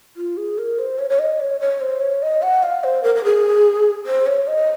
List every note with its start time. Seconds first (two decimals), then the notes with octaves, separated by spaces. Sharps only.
0.17 F4
0.37 G#4
0.58 A#4
0.79 C5
0.99 C#5
1.09 C#5
1.19 D#5
1.40 C#5
1.60 C#5
1.81 C5
2.01 C#5
2.22 D#5
2.42 F#5
2.63 F5
2.84 C5
3.03 A#4
3.15 A#4
3.24 G#4
4.06 C5
4.26 C#5
4.47 D#5